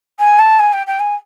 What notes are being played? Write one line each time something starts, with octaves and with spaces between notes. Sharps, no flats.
G#5
A5
G#5
G5
G5
G#5